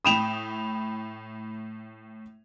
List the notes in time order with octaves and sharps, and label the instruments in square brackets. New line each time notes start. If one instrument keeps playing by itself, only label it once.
[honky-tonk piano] A2 G5 D#6 [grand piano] B5 E7 F7